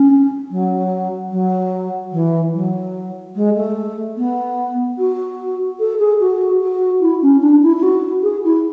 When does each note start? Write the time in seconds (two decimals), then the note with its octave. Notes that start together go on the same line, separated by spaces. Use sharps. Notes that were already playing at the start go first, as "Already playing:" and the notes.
Already playing: C#4
0.50 F#3
1.31 F#3
2.12 E3
2.53 F#3
3.35 G#3
3.55 A3
4.17 B3
4.98 F#4
5.80 A4
5.99 G#4
6.20 F#4
6.61 F#4
7.00 E4
7.22 C#4
7.41 D4
7.62 E4
7.76 E4
7.82 F#4
8.23 G#4
8.44 E4